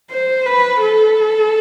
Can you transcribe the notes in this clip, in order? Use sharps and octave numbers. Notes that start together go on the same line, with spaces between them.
C5
B4
A4